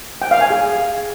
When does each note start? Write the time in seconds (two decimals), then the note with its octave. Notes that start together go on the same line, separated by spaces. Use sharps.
0.22 G5
0.31 F5
0.41 G#5
0.50 G#4